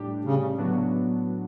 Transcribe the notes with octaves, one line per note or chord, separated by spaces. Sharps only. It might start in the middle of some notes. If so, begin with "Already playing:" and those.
Already playing: A2 G3 D4 G4
C#3
A2 D3 F#3 B3 D4 F#4
C#3